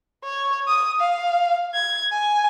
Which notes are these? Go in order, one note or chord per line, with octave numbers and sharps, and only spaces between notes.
C#5
D#6
F5
G#6
G#5